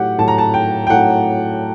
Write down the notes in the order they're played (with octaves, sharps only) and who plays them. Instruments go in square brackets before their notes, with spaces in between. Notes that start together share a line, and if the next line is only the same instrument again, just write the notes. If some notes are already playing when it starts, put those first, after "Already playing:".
Already playing: [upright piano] A2 F#3 G4 F#5
A2 F#3 A5
A#5
A5
G5
G5
A2 F#3 F#5